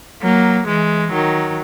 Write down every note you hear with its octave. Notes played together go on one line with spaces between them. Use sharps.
F#3 A#3
E3 G#3
D#3 F#3